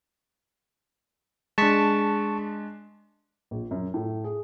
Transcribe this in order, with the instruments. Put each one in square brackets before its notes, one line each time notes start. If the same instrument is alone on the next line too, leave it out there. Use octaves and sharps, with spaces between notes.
[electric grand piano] G#3 D4 [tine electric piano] A5 C#6 B6
[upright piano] A#1
F#2
A2
G#4